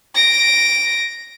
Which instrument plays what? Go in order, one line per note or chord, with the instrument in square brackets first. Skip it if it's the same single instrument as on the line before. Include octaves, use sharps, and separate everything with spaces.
[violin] A#6 D7